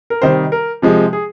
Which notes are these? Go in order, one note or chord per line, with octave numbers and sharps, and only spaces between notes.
A#4
C3 D#3 G3 C5
A#4
C3 F3 G#3
G#4